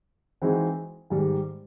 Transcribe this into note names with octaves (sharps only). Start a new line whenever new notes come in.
E3 G#3 C4 D#4 F#4
G#2 D#3 G3